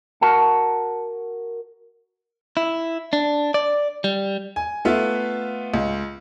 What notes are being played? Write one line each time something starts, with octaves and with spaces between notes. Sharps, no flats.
F#4 A#4 F#5 A5
E4
D4
D5
G3
G#5
A3 B3 F4 E5
C#2